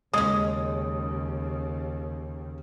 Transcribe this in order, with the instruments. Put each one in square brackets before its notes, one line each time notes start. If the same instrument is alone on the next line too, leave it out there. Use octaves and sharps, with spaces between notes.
[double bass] D#2 C#3 [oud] G#3 C#4 [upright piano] D#6